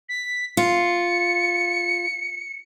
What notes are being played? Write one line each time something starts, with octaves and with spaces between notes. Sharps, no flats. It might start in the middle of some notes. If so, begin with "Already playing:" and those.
B6
F4 C#7